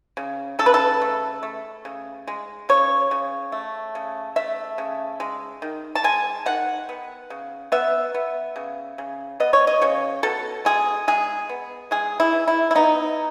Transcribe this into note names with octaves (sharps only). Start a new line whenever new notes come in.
C#3
C#3 A4
B4
A4
A3
A3
C#3
G#3
C#3 C#5
C#3
A3
C#3
A3 E5
C#3
G#3
D#3
A5
G#3 G#5
D#3 F#5
B3
C#3
B3 E5
B3
C#3
C#3
B3 D#5
C#5
D#5
C#3 C#5
B2 A4
G#3 G#4
G#3 G#4
B3
G#3 G#4
E4
E3
E4
E4
B3 D#4